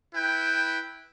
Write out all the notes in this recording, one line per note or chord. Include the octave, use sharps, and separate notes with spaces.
E4 B4 G5